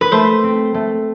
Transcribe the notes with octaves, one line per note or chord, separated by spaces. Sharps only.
B4
A3 C5
C4
A3